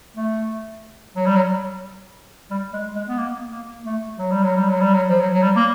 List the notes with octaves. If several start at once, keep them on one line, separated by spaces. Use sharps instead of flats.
A3
F#3
G3
F#3
G3
G#3
G#3
B3
A#3
A#3
A3
F#3
G3
F#3
G3
F#3
G3
F#3
F3
F#3
F#3
G3
A#3